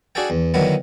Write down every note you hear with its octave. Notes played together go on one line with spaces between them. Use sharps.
D4 F#4 G#4 A4 G5
E2
D3 D#3 F#3 B3 E4